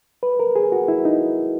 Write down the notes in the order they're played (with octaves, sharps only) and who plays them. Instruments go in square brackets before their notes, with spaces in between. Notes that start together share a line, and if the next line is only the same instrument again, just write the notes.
[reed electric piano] B4
A#4
G#4
F#4
E4
D#4